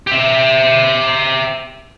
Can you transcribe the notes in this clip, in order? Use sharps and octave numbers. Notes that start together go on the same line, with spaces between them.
G4 E5